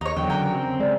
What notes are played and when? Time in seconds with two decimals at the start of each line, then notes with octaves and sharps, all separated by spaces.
0.01 D#2 D#4 C#5
0.16 E2 D3 F#3 G5
0.30 C#3 A#4 G5
0.55 C4
0.80 C#3 G#3 D5